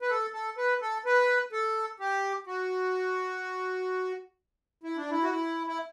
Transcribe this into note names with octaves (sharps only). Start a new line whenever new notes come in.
B4
A4
A4
B4
A4
B4
A4
G4
F#4
E4
D4
E4
F#4
E4
E4